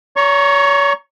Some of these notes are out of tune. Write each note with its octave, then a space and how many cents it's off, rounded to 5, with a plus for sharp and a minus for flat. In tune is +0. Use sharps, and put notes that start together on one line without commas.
C#5 +35 A#5 +0 C#6 -10